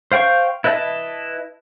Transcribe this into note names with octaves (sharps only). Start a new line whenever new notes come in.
C5 F5 G5 C#6
E4 B4 D#5 E5 A5